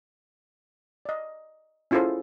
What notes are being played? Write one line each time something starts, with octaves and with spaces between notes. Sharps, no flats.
D5 D#5
C#4 E4 F4 G#4 A4 C5